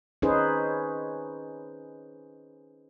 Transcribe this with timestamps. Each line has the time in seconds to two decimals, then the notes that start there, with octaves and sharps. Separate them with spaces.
0.22 C#4 D#4 G#4 B4 C5